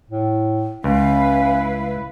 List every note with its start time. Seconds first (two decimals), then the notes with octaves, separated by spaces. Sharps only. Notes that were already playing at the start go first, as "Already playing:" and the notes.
0.10 A2
0.84 C#2 C#4 E4 B4 F5